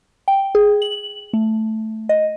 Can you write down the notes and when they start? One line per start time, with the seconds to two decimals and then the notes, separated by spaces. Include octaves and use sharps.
0.28 G5
0.55 G#4
0.82 F#7
1.33 A3
2.09 D#5